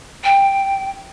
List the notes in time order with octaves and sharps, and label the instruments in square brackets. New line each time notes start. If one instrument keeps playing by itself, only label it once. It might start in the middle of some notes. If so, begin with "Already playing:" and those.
[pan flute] G5